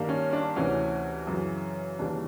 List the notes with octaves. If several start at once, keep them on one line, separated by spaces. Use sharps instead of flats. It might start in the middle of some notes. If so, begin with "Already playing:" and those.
Already playing: G2 D#3 G3 A#3
C#4
D4
D2 C3 E3 C#4
F#2 C#3 E3
D#2 C#3 E3 G3 D4